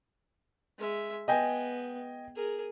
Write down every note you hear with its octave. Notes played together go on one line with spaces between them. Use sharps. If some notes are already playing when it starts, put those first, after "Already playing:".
G#3 E5
B3 D#5 G5 G#5
G#4 A#4